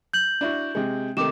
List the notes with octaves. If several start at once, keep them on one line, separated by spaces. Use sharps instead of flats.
G6 F#7
D4 E4 F#4
C3 G#3
C3 D#3 A3 D6 E7